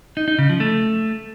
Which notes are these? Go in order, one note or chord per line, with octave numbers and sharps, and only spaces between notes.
D#4
D#4
C#3
F3
A3